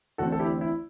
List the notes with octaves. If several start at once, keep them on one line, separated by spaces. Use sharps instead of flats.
E2 D3 A3 C4 F#4 A4
A4
E4 G4
E4